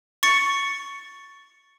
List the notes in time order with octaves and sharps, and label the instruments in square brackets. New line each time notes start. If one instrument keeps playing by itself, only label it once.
[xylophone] C#6 A6 C#7